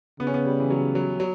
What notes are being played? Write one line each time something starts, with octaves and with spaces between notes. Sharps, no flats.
C#3 B3
C#4
B3
G3
E3
F#3
F#3
F#3